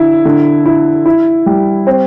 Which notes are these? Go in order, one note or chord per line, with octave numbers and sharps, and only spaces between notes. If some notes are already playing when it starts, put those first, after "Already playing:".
Already playing: D3 E4
D3
E4
E4
G3
C4